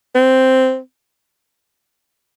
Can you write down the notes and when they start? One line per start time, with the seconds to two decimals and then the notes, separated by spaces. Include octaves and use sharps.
0.15 C4